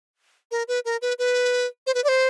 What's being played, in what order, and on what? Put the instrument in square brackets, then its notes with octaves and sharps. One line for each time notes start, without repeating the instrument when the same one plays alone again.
[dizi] A#4
B4
A#4
B4
B4
C5
B4
D5
C5